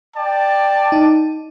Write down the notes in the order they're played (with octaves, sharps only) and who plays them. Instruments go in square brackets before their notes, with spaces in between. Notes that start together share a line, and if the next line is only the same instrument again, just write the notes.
[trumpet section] D5 G5 A5
[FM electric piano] D#4